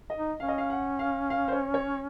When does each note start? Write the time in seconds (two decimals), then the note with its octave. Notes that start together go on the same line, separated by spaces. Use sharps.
0.10 D#5
0.17 D#4
0.39 C#4 F5
0.48 D#5
0.58 F5
0.70 F#5
0.99 F5
1.30 F5
1.48 C5
1.52 C#5
1.74 C#5